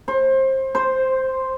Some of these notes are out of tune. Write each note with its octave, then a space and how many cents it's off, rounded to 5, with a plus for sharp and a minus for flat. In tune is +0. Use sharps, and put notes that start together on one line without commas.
C5 +25
C5 +0